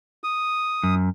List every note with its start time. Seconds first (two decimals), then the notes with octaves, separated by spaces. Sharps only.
0.24 D#6
0.83 F#2